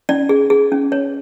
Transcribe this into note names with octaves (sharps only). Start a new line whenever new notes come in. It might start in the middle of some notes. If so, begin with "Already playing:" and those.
C#4 D5
G#4
G#4
C#4
C#5